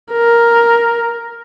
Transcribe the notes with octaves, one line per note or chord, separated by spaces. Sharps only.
A#4